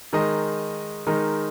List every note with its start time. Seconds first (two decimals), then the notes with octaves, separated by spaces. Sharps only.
0.13 D#3 G#3 D#4 A#4 D#5
1.07 D#3 G#3 D#4 A#4 D#5